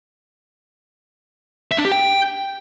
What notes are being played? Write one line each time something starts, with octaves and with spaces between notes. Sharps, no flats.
E5
D4
G4
G5